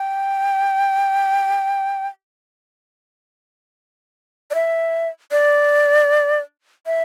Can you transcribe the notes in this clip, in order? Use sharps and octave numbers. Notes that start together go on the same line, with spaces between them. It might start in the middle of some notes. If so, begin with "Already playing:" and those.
Already playing: G5
D5
E5
D5
E5